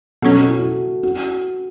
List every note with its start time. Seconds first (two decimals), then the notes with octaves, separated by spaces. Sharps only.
0.22 B2 F#3 C#4 A4
0.35 F#4
0.48 E4
0.59 F#4
1.03 F#4